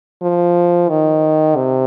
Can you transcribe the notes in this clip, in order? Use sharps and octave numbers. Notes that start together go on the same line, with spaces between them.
F3
D#3
C3